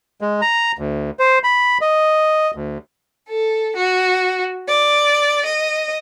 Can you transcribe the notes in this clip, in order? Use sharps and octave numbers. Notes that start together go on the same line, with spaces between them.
G#3
A#5
D2
C5
B5
D#5
D2
A4
F#4
D5
D#5